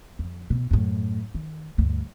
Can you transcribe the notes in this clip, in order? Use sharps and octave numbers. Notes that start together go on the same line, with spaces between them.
F2
B2
F#2 A2
D#3
D2 G2